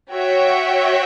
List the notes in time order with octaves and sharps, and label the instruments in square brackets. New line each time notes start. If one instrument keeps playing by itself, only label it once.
[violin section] F#4 C#5 E5 G5